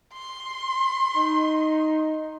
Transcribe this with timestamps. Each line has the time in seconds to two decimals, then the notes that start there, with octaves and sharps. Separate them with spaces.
0.14 C6
1.17 D#4